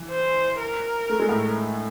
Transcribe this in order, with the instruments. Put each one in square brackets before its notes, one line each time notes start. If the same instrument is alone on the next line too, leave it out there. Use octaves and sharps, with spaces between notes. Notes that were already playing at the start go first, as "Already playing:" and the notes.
Already playing: [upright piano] E3
[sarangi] C5
A#4
[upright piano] A3
G#3
A2 A3